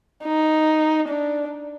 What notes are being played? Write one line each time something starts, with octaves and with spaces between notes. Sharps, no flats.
D#4
D4